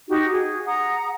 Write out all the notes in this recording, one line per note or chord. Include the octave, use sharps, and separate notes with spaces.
D#4 F#4 G4
G#4
F#5 A#5 D#6